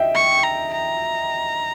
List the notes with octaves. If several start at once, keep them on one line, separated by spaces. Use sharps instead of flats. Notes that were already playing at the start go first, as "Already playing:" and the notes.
Already playing: D#5 E5 G5
C#6
A#5
A#5